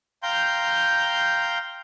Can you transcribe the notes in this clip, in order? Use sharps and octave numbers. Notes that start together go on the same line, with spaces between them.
F5 G5 A#5 C6 G6